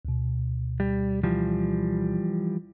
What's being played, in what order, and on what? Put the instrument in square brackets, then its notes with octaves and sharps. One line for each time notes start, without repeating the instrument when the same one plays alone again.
[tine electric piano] D2 B2
[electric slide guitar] G3
E3 F3 G3